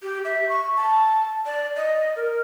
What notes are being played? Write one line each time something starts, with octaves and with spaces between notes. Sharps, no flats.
G4
E5
C#6
A5
D5
D#5
A#4